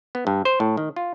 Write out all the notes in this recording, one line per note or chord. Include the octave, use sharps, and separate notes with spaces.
B3
G2
C5
A2
D#3
F4